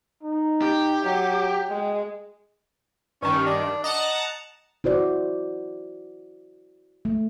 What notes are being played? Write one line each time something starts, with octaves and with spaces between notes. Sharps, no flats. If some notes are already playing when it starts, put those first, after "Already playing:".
D#4
G4
F#3
G5
G#3
G2 D#3 C#4
D4
D#5 F#5 A5 A#5
E4 F#4 C5 D5
A3